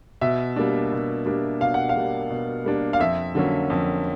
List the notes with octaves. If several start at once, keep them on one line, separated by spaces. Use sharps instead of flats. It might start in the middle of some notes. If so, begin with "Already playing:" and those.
B2 E5
G3 A#3 D4
B2
G3 A#3 D4
B2 F5
F#5
F5
G3 A#3 D4
B2
G3 A#3 D4
F5
F2 E5
D3 F#3 A#3 C#4
F2